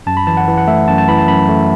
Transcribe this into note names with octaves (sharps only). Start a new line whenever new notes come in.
F#2 A5
B5
E3 A5
F#5
E3
F#5
A3 E5
F#2 A5
A5
E3 B5
A5
F#2 B5
A3